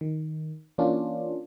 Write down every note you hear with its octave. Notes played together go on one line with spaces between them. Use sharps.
D#3
E3 A#3 C#4 D4 F4